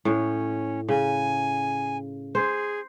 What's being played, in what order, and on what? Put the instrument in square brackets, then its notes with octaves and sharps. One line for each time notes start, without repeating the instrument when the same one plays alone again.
[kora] A2 [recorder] C#4
[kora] C#3 [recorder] G#5
[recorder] G#4 [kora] C5